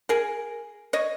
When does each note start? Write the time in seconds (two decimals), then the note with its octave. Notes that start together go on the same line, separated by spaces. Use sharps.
0.09 G#4 A#4
0.93 C#5 D#5